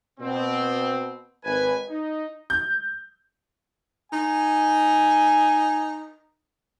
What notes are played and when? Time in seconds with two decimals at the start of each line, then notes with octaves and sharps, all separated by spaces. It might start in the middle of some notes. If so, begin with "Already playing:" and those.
0.20 B2 C4
1.45 G#1 B4 G#5
1.89 D#4
2.50 G6
4.12 D#4 G#5